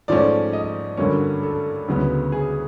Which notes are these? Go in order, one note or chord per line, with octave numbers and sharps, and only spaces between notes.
G#2 F3 A3 C#4 D5
D#5
G2 D3 F#3 A#3 C#4
A4
D2 C#3 F#3 B3
G#4